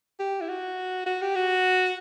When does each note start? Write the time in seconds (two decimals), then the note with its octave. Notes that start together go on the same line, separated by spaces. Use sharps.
0.19 G4
0.41 E4
0.49 F#4
1.06 F#4
1.22 G4
1.35 F#4